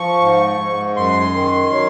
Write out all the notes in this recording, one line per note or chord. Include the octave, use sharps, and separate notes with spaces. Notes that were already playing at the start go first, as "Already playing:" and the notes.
Already playing: F3 C#6
G#2
G#2
F#2 C6
D#3
F#3